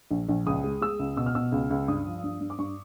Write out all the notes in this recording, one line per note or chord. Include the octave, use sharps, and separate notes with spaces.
A#1
A#1
C#2 D#6
G#3
G#3 E6
C#2
B2 E6
F6
B2 E6
C#2
C#2
G2 D#6
F3
G2
G2
D6
G2 C#6